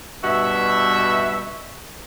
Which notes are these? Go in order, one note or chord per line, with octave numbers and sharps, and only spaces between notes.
G2 B2 F#4 E5